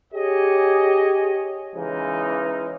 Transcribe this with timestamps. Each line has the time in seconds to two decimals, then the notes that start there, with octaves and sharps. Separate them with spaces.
0.13 G4 G#4 C#5 D#5
1.75 C#3 E3 G#3 A#3 D#4